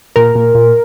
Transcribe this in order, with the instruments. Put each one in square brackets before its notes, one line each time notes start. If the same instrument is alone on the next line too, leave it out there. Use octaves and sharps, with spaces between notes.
[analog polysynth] A#2 A#4
A#2
A#2